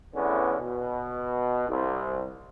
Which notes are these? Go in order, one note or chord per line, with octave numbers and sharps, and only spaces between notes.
E2 A2 D3 B3 C#4
B2
C2